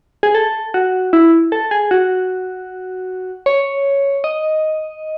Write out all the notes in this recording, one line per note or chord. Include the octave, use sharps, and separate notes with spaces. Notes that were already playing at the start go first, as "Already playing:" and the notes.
G#4
A4
F#4
E4
A4
G#4
F#4
C#5
D#5